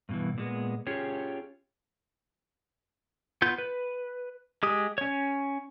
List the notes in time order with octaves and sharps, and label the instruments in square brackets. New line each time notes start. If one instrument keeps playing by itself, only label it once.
[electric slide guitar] G2 B2 E3
A#2 G#3 B3
C#4 F4 G4 G#4 C#5
[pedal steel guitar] B3 F4 G6
B4
G#3 G4 D#6
C#4 C#5